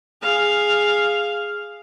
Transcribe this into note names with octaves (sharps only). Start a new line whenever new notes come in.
G#4 F5